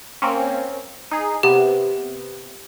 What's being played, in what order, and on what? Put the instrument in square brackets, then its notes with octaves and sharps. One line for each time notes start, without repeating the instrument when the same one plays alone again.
[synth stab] A#3 C4 C#4
D#4 G#4
[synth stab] C3 B3 [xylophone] G4